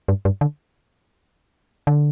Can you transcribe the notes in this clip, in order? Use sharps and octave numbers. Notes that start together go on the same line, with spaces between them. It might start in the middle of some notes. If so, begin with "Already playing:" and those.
G2
G2
D3
D3